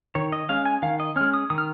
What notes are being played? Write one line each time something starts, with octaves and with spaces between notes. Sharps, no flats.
D#3 C#5
D#5
G#3 C#4 F5
G#5
D#3 F5
D#5
G#3 C#4 F6
D#6
D#3 D#6
F6